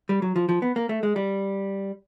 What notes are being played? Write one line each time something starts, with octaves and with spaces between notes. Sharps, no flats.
G3
F#3
F3
F3
B3
A#3
A3
G#3
G3